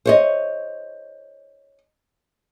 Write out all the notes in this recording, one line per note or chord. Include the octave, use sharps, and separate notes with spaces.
C5 C#5 D#5